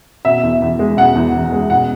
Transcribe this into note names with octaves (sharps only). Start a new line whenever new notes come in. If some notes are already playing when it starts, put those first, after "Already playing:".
B2 E5
E2
E2
G#3
B2 F#5
E2
E2
G#3
B2 F#5